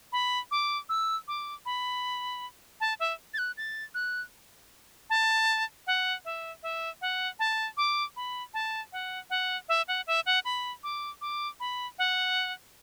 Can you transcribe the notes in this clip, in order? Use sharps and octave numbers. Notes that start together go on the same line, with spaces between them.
B5
D6
E6
D6
B5
A5
E5
A6
F#6
A6
F#6
A5
F#5
E5
E5
F#5
A5
D6
B5
A5
F#5
F#5
E5
F#5
E5
F#5
B5
D6
D6
B5
F#5